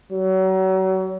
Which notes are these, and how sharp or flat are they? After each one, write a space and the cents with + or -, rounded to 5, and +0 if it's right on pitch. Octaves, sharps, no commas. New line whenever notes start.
F#3 +35